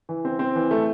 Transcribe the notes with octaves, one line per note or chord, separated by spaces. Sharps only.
E3
C4
C4
E3
A3